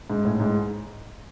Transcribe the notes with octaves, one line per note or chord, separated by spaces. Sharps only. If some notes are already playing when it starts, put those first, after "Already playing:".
G#2
A2
G#2